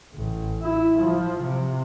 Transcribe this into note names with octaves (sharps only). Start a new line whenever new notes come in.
A1
E4
F3
C3